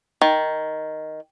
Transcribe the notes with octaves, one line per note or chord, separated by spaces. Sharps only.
D#3